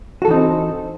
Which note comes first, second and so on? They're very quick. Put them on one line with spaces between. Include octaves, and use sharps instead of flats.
F#4 A4 E3 D#4 C4